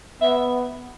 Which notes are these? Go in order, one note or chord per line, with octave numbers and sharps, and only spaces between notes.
B3 E5